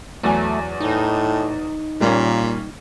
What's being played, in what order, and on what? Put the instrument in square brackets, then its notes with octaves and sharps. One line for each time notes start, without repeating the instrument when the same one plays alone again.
[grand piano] E2 F#3 G#5 [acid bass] A3
[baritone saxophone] A2 [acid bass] D#4
[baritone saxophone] A#2 [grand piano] G3 A#3 C#4